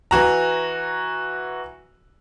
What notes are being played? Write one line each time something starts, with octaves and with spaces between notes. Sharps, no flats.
E3 F#4 A#5